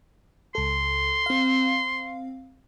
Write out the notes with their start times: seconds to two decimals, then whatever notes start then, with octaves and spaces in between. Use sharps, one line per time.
0.55 C#2 A4 C6
1.26 C4 F5